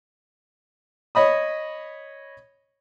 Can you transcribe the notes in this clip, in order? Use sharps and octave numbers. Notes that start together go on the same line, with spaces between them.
C#5 D#5 B5 D#6